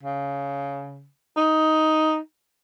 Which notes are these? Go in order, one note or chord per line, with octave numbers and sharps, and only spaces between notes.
C#3
D#4